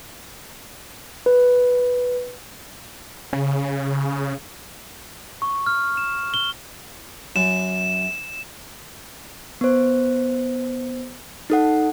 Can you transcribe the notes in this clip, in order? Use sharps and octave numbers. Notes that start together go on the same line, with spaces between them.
B4
C#3
C#6
F6
E7
G7
F#2 E7
B3 C5
D#4 A4 F#5